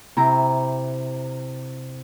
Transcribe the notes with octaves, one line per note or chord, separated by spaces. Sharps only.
C3 E4 A#5